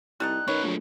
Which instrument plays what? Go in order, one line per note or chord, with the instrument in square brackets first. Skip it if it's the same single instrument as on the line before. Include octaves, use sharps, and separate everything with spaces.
[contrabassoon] C2 [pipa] G3 A3 D#4 [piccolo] F#6
[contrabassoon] D#3 [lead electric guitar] C#4 B4 [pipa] C#5
[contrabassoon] A#1 [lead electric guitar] F#3 A3